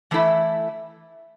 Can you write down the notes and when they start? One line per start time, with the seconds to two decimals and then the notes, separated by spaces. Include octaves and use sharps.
0.11 E3 A3 E4 A4 E5